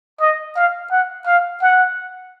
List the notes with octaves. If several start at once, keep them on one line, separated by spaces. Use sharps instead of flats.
D#5
F5
F#5
F5
F#5